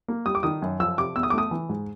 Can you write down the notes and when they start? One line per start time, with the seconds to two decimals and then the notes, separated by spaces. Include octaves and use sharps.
0.08 A#3
0.26 G3 D#6
0.35 D6
0.43 D#3 D#6
0.62 F#2
0.80 F3 E6
0.98 C3 D6
1.16 E2 E6
1.23 D#6
1.30 D6
1.34 A3 D#6
1.51 E3
1.69 G#2